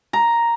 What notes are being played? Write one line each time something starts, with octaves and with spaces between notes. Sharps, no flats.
A#5